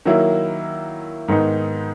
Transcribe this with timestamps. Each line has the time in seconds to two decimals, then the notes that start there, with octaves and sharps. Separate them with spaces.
0.05 D#3 F#3 A#3 E4
1.28 G#2 D#3 G#3 B3 D#4